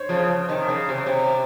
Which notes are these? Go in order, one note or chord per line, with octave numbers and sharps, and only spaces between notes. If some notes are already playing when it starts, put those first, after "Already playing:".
Already playing: C5 C#5
C#3 F3
C3 D#3
C#3
C3
C#3
C3